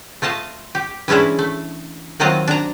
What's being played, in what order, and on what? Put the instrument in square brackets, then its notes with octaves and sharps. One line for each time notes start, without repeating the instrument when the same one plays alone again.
[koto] A3 F4 D#5 A5
G4
E3 G#3 C#4 D4 E4
A3
D#3 F#3 C4 F4 D#5
D4 A#5